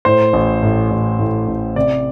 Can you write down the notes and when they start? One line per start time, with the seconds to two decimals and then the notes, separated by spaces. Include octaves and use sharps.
0.05 A2 C5
0.33 A1
0.63 A2
0.91 A1
1.19 A2
1.47 A1
1.76 C3 D5